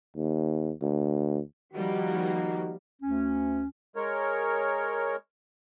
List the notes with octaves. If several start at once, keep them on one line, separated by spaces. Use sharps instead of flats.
D#2
D2
D#3 F3 G3 A#3 D#4 F#4
D2 C#4
G#3 A#4 C#5